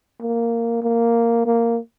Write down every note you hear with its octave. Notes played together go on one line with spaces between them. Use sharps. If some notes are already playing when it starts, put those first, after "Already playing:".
A#3
A#3
A#3